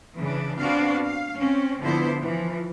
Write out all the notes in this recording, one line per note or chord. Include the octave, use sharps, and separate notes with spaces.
C#3 E3 D4
B3 C4 D4 F#4 F5
F5
C4 C#4
D3 F3 B3 E4 C5
E3 F3